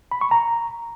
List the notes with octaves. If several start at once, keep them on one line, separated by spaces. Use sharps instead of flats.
B5
C#6
A#5